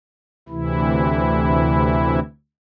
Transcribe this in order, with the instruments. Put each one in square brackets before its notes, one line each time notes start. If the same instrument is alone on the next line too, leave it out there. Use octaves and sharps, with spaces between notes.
[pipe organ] D2 C3 E3 E4